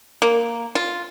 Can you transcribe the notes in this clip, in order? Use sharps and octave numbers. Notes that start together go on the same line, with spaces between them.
A#3
F4